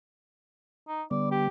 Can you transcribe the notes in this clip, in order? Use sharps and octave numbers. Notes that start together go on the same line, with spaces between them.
D#4
D3 G3 B3 D5
G4